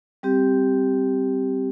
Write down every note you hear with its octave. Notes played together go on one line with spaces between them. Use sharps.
G3 C4 G4